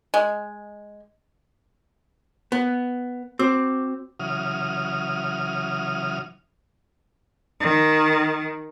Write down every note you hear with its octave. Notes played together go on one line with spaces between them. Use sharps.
G#3
B3
C4 F#4 D6 E6
C#3 E3 F#3 D#6 F6
D#3